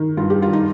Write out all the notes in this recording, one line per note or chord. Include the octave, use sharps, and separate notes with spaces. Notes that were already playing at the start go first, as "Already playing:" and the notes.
Already playing: D#3
G2 F4
G4
D#3 F4
D#4